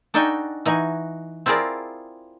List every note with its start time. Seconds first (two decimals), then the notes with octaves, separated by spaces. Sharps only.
0.14 D4 D#4 F#4 A4 G5 G#5
0.66 E3 D#4 F#4 G#5
1.46 C4 E4 F4 G#4 A#4 D5